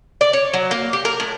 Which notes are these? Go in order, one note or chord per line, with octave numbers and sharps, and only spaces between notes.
D5
C#5
F#3
A#3
G4
A#4
A2